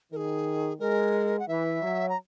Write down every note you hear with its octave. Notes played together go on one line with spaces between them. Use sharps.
D#3 G#4 A#4
G#3 A#4
F#5
E3 E5
F#3
A#5